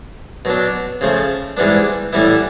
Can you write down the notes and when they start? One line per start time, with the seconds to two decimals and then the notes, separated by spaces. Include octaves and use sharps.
0.45 B2 F#3 B3 D4
1.01 C#3 F3 A3
1.57 G#2 E3 G3 B3 D4
2.13 A2 E3 G3 B3 E4